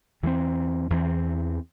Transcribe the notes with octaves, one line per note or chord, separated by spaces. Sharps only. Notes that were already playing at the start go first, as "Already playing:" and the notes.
E2 E3 G3 C4
E2 E3 G3 C4